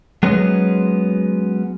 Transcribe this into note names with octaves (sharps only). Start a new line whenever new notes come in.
F#3 G#3 B3 C#4